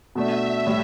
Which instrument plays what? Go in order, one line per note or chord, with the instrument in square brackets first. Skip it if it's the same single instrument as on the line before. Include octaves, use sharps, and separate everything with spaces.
[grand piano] B2 A3 D4 [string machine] E5
[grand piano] A2 G3